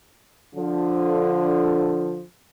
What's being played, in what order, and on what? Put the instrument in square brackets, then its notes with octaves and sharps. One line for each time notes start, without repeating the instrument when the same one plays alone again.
[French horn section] D3 F3